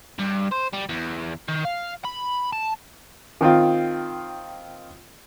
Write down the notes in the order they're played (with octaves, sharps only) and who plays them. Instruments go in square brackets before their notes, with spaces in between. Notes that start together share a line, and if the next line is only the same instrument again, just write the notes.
[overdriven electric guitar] G2
C5
G3
E2
D#3
F5
B5
A5
[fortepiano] D#3 C4 F4